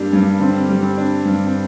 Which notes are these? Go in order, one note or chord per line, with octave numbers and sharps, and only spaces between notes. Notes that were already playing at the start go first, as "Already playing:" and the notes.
Already playing: G2 G3 A#3 C4 D4
G2
D3 C4
G3
C4
D4
G2
C4